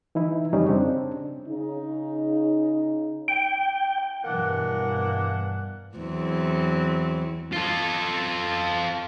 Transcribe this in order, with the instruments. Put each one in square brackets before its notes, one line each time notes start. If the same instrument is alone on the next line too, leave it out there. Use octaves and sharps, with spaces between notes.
[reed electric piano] E3 D#4 E4
F2 C#3 G3 C#4 D#4
C#3 C4 D4
[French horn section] C#3 D#4
[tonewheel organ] G5
[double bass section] G2 B2 E3 [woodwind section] A#3 D4 F#5
[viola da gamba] E2 F#3 C4
[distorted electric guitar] F4 A4